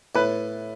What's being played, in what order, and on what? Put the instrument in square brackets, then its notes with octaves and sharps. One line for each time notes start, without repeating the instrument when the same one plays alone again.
[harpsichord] A2 [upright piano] B4